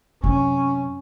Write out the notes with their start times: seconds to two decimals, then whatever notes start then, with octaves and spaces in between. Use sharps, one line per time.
0.24 F#2 C3 C#4